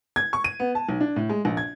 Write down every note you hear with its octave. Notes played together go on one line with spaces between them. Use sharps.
G#6
C#6
D#7
B3
A5
B1
D4
A2
G#3
A#1
G#6